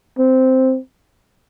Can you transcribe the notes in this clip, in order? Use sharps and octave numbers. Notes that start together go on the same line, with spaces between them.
C4